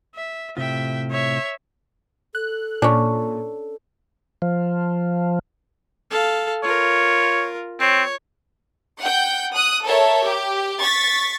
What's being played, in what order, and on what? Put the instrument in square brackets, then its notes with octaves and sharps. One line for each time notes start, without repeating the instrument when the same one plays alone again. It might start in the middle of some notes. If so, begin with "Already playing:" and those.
[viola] E5
[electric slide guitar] A2 C3 F4 [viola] E5 G5
[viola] C#5 E5
[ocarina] A4 [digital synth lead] F#6
[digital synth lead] A#2 [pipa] C#4 D4
[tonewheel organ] F3
[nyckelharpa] A4 F5
[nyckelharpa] F4 A#4 [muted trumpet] C#5
[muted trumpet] C4 [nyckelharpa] C#5
[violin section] F#5 G5 G6
D#6 F#6
A4 A#4 C#5 E5
G4
C#6 A6 B6